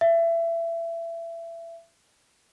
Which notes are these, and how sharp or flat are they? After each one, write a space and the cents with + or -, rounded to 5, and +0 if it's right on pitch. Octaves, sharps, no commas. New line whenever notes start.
E5 +25